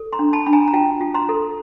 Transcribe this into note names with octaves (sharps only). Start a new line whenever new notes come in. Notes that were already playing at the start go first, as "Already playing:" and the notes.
Already playing: A4
A#5 C6
D4
A5 B5
D4 B5
G#5 A#5
A#5
F4 G5 A5
F4
A#5 C6
A4